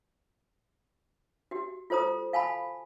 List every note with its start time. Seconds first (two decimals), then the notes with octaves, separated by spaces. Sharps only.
1.51 F#4 G4
1.90 F4 A4 C5 A#5 D#6
2.33 F5 G#5 A5 B5